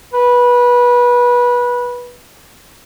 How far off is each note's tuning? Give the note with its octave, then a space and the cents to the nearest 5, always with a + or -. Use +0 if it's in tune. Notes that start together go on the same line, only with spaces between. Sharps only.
B4 -20